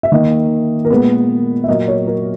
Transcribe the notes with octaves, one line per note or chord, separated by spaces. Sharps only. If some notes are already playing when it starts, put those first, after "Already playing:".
E5
D#3 A#3 D#5
A#4
A#2 G#3 B3 B4
E5
A#2 F#3 A#3 D#5
C#5
A#4